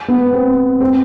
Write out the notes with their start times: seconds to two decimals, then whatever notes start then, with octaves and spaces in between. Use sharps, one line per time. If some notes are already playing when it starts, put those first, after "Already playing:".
0.08 B3
0.33 C4
0.80 C4